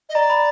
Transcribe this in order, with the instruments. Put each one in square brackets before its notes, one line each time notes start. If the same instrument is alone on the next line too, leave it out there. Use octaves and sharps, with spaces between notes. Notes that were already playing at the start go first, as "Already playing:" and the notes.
[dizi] D#5
[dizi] D5 [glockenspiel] A#5
[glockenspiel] B5